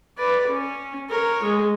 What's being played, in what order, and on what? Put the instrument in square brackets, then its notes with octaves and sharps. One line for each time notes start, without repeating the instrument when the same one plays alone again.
[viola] B4 D5
C#4
A#4 C#5
G#3